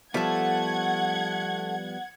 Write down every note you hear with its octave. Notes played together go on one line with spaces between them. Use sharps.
F3 G3 A3 B3 A4 F#5 G#6